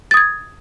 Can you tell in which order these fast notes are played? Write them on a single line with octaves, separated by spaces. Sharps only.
A6 D#6 G#6